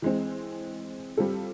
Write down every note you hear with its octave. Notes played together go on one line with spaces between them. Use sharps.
E3 G#3 C4
G3 C4 F4 A4